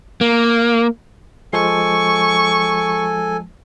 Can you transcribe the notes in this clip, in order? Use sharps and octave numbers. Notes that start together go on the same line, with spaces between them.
A#3
F3 G#3 A4 G#5 C#6